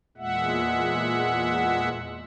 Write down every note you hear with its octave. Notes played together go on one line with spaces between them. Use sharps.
E2 A#2 G#3 E5 F#5